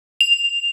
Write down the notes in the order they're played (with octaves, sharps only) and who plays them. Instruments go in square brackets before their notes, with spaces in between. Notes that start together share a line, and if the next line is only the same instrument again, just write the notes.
[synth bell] F7